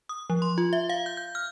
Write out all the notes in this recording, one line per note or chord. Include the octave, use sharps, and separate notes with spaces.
D#6
F3
C6
F4
E5
F5
G6
G6
F6